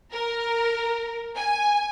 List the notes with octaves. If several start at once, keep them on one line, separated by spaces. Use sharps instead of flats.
A#4
G#5